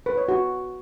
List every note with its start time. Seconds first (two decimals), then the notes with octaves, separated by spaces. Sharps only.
0.06 B4
0.17 C#5
0.28 F#4